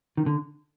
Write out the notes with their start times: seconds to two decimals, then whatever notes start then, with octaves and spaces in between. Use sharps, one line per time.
0.17 D#3
0.26 D3